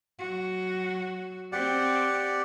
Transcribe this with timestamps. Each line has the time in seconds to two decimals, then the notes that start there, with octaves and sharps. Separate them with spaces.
0.19 F#3 F#4
1.52 C4 G4 D5 F#5